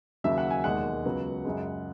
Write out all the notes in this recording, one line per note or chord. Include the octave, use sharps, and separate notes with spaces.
D#2 C#3 F#3 E5
F#5
G#5
E1 D#2 D#3 G#3 F#5
C#2 C#3 F#3 B3
F#2 C#3 G#3